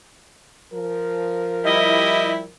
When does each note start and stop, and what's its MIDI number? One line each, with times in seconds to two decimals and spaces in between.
0.72 2.50 53
0.72 2.50 70
1.64 2.42 55
1.64 2.42 64
1.64 2.32 75